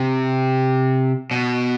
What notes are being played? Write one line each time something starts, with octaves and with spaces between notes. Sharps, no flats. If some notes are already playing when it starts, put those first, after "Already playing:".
Already playing: C3
B2